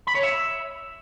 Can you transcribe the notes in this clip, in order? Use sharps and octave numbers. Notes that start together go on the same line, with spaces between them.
B5
C#5
E5